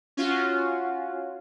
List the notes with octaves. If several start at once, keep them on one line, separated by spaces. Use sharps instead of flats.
C#4 F4 F#4